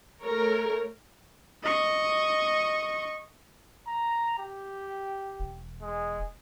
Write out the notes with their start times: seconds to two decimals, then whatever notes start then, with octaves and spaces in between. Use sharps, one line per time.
0.23 A3 A#4 C#5
1.63 D#5 C#6
3.88 A#5
4.39 G4
5.40 E1
5.82 G#3